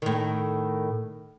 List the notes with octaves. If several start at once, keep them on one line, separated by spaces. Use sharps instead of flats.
A2 D#3